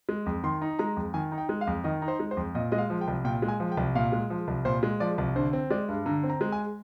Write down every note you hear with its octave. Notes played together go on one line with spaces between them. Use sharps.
G#3
F2
D#3 C6
D#4
G#3 A#5
F2
D#3 G#5
D#4
G5
G#3
F5
F2
D#3 D#5
D#4
C5
G#3
C5
F2
A#2 D#5
G#3 D#5
F5
F3
G5
C2
A#2 G5
G#3
G#5
F3
G5
C2
A#2 F5
G#3
F3
C2
A#2 C5
G#3
F3 D5
C2
D3 C5
C4
G#3 D5
G2
D3 A#5
C4
A#5
G#3
G#5